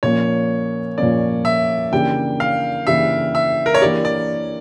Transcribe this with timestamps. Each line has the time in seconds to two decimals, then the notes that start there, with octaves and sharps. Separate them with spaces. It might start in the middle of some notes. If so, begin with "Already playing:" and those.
0.03 A#2 F3 A#3 C#4 C#5
0.98 A#2 F3 A#3 C#4 D5
1.45 E5
1.92 C#3 E3 A#3 D4 G4 G5
2.40 F5
2.87 C#3 E3 A#3 D4 G4 E5
3.35 E5
3.66 A#4
3.74 C#5
3.81 E3 A#3 D4 G4 D5
4.05 D5